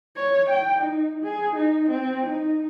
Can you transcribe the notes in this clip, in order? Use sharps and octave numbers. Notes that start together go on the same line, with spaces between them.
C#5
G5
D#4
G#4
D#4
C4
D#4